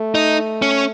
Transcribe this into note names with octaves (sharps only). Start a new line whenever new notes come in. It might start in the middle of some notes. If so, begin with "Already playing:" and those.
Already playing: A3
D#4
C#4